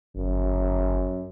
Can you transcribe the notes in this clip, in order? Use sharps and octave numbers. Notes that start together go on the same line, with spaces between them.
G1 F#2